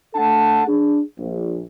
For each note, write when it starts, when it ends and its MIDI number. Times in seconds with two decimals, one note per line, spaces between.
0.15 0.62 57
0.15 0.62 62
0.15 0.62 69
0.15 0.62 78
0.15 0.62 81
0.67 0.99 62
0.67 0.99 68
1.18 1.60 34